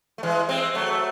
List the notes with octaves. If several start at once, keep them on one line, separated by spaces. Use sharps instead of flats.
A3
E3 G#3
G#3 C4
F#3 A3